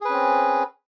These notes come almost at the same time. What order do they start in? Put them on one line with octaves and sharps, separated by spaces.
G#4 B4 C#4 C4